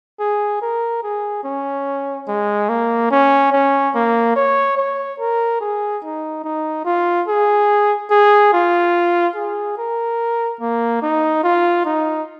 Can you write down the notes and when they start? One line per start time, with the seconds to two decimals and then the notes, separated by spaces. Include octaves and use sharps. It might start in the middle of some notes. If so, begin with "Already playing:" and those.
0.20 G#4
0.62 A#4
1.03 G#4
1.44 C#4
2.28 G#3
2.69 A#3
3.11 C#4
3.52 C#4
3.95 A#3
4.36 C#5
4.77 C#5
5.19 A#4
5.61 G#4
6.03 D#4
6.44 D#4
6.85 F4
7.28 G#4
8.11 G#4
8.53 F4
9.36 G#4
9.78 A#4
10.61 A#3
11.02 D#4
11.43 F4
11.85 D#4